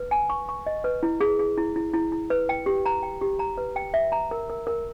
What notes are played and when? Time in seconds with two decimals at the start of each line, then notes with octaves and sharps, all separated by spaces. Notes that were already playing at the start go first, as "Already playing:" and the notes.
Already playing: B4
0.11 G#5
0.30 C#6
0.49 C#6
0.66 D#5
0.84 B4
1.03 E4
1.21 G#4
1.39 G#4
1.58 E4
1.76 E4
1.94 E4
2.12 E4
2.30 B4
2.49 G5
2.66 G4
2.86 A#5
3.03 G5
3.22 G4
3.39 A#5
3.58 B4
3.76 G5
3.94 E5
4.12 A#5
4.31 A#4
4.50 A#4
4.67 A#4